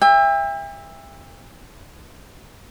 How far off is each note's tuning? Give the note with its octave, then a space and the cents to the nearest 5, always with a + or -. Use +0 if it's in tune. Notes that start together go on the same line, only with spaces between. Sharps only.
E5 +0 G5 +40